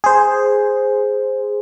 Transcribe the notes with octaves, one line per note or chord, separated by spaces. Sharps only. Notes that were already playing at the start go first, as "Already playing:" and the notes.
G#4 C5